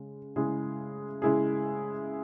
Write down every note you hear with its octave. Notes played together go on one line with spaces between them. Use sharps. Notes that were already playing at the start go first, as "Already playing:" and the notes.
Already playing: C#3 G#3
C#3 G#3 E4 G#4
C#3 G#3 E4 G#4